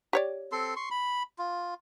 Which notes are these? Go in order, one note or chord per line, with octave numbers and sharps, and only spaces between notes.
G4 C#5 D5
C4 A4 C6
C6 C#6
B5
F4